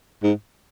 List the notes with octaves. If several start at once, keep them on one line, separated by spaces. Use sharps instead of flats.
G#2